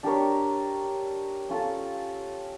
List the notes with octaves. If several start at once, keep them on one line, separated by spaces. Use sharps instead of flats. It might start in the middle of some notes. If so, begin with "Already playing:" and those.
D4 G4 A#4 C#5
C#4 F4 A4